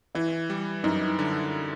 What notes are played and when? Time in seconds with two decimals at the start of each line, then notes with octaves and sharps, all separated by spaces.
0.15 E3 E4
0.50 G3
0.84 F#2 D#4
1.19 D3